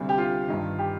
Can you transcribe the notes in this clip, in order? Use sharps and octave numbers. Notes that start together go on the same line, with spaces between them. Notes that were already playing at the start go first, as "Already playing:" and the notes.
Already playing: D2 C3 G3
G4
F4
G1 G2 D#3
G4